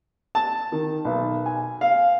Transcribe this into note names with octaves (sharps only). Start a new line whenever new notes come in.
A5
D#3
B1
G#5
F5